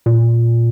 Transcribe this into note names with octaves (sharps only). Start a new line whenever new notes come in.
A#2